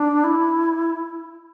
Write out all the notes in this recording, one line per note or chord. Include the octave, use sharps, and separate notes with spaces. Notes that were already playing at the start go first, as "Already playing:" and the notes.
Already playing: D4
E4